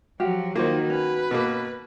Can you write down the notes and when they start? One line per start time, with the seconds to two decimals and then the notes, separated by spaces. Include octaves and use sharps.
0.20 F3 F#3 F#4 G4 F5
0.56 D#3 A#3 F4 F#4 C5
0.90 C#4 B4
1.31 B2 A#3